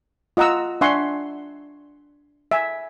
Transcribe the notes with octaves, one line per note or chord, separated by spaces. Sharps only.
F4 D#5 F#5 A#5 E6
D4 E5 F#5 G#5 C6 C#6
E5 G#5